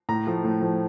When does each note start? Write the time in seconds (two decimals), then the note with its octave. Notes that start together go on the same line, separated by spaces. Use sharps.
0.09 A2 A#5
0.27 F3 A3
0.44 A2
0.61 F3 A3